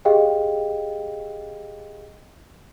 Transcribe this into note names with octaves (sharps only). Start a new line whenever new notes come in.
G4 G#4 D#5 F5 G5